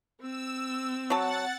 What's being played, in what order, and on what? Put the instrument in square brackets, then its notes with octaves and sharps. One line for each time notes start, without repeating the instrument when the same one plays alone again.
[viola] C4 [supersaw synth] E6
[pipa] F#3 A5 [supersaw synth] F#5 A6